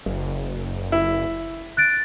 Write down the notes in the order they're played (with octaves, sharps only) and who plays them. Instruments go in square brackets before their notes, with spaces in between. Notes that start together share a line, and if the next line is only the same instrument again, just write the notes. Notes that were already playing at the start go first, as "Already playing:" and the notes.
[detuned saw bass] F#1
[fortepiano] E4
[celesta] F#6 A6 D7